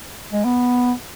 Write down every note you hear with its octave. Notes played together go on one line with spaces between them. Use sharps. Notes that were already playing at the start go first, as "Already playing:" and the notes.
G#3
B3